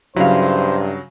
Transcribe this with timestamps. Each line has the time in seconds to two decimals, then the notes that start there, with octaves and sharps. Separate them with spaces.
0.16 G2 C#3 F#3 E4 C5 F5